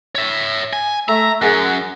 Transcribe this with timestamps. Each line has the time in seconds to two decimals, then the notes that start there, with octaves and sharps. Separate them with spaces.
0.15 C#5 E5
0.73 G#5
1.09 A3 E5 A#5
1.42 F#2 G#4 A#4 F#5